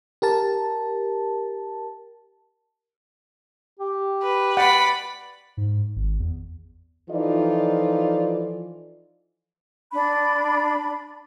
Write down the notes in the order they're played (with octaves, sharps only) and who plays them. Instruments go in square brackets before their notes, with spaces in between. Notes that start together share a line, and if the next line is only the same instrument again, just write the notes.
[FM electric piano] G4 A#4 A5
[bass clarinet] G4
[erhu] B4
[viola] D5 B5 [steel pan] F#5
[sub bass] G#2
G#1
E2
[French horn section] E3 F3 D#4 F4 A4 D5
[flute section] D4 B5